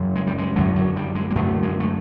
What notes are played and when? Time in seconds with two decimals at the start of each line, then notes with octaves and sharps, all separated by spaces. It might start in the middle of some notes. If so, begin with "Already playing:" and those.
Already playing: F#2 C#3
0.16 G#3
0.27 G3
0.38 G#3
0.56 F#2 D3 F#3
0.76 F#3
0.96 G3
1.15 G#3
1.30 A#3
1.35 F#2 D3 A3
1.63 G#3
1.80 A3